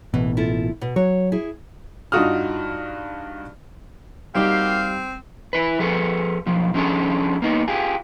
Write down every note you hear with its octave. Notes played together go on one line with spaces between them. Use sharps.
A1 B2 E3
E4 F4 A4
B2
F#3 C#5
E4 G#4
G2 D#4 F4 F#4 D#6 F6
G3 A#3 C4 D#4 F#4 G4 F5
E4 B4
F3 G#4 A4 B4
B1 F3
F3 C#4 D4 G#4 A4
A#3 B3 D#4
F4 G4 G#4